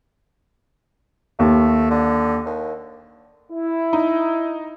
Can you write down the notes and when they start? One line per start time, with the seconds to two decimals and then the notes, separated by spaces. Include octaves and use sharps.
1.39 D#2 A3
1.91 D3
2.45 D#2
3.52 E4
3.93 D#4